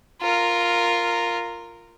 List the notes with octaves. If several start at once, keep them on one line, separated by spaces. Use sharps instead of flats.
F4 A#4